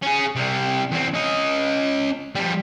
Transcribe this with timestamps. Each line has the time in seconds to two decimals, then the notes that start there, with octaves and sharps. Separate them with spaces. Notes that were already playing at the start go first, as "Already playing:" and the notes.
0.02 C#4 G#4
0.35 C3 G3
0.91 E2 C4
1.14 C#4 D#5
2.35 F3 G3